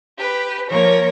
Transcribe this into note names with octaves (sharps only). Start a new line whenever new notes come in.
G4 B4
F3 A#3 A#4 C#5